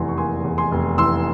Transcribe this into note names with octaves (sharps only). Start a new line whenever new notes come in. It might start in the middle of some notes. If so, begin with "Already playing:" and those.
Already playing: F1 E2 E3 G#5 C6
C#6
A#3 G#5 C6
E2
G#5 C6
F1
E3 C6 E6